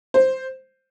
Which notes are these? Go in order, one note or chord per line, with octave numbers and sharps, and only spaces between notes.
C5